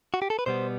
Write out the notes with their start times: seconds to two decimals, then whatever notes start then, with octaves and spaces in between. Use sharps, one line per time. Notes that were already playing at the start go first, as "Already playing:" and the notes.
0.14 F#4
0.22 G4
0.30 A4
0.39 B4
0.46 B2 G3 B3 C5